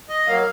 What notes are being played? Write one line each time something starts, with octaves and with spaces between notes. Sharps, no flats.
D#5
F#3 A#3 F5